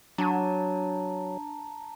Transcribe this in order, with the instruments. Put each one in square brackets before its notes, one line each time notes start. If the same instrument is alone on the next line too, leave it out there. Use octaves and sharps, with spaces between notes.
[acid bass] F#3 [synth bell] D4 [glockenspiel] A5 A#5